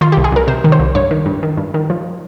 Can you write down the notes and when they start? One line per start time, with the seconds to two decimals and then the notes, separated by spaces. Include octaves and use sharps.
0.01 D#3 F4
0.12 G4
0.17 C2
0.24 G#4
0.32 C2 A#4
0.47 C3 C5
0.64 D#3
0.72 C5
0.79 C2
0.95 G2 C#5
1.11 D#3
1.26 G2
1.43 D#3
1.58 G2
1.74 D#3
1.90 F3